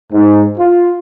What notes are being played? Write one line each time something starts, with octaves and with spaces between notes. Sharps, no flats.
G#2
F4